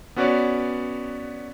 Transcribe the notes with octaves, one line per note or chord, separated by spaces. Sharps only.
B3 C#4 F#4 B4 C#5 D5